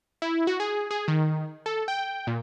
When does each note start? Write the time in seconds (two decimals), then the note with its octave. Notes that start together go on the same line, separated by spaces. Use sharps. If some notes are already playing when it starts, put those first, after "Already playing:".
0.22 E4
0.47 F#4
0.60 G#4
0.91 G#4
1.08 D#3
1.66 A4
1.88 G5
2.27 A#2